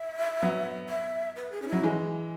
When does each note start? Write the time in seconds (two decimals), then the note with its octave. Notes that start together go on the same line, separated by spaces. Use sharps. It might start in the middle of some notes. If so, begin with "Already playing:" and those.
Already playing: E5
0.42 F#3 B3
0.89 E5
1.36 B4
1.52 G#4
1.62 C#4
1.68 F#3 E4
1.83 E3 G#3